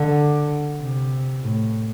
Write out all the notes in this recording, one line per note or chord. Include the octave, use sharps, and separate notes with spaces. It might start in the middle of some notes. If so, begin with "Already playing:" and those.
Already playing: D3
C3
A2